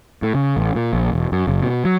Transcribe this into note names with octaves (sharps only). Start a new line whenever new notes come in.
A2
C#3
A1
A#2
A#1
E1
F#2
F#1
B2
F#3